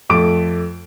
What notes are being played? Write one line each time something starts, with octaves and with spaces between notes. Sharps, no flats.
F2 A3 D6 D7